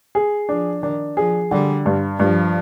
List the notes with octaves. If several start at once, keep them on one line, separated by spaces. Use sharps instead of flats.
G#4
F3 D4
D#3 D4
F3 G#4
D3 G3
G2
G2 F3